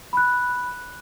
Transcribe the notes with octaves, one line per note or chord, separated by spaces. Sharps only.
B5 F#6